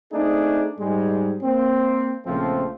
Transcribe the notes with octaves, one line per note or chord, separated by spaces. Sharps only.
A3 C4 D4 D#4 G#4
G#2 G3 G#3
A#3 C4
A#1 C#3 F3 A3 C4